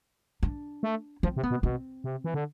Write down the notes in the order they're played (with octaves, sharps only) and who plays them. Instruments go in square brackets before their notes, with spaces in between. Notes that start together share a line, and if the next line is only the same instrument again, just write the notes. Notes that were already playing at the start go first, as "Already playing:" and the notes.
[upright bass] D4
[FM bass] A3
[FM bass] F3 [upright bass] C4
[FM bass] C3
[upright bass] B3
[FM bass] B2
[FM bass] B2 [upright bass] C4
[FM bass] C3
E3
D3